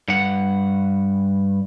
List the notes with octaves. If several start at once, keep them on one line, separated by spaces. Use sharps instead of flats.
G2 F#5